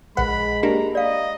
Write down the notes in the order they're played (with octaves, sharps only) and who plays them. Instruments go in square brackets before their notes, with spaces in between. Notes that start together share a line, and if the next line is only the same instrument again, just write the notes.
[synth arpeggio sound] A#1 F#5 [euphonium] G#3 [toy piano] B4 [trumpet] B5
[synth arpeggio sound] A#3 D4 [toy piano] G4 [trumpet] A#5
[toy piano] D5 F5 [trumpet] D#5